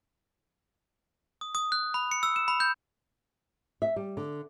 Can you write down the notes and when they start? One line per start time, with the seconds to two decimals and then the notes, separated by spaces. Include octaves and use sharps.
1.41 D#6
1.55 D#6
1.72 F#6
1.94 B5
2.11 C#7
2.23 E6
2.36 E7
2.48 B5
2.60 G6
3.82 E5
3.96 G3
4.17 D3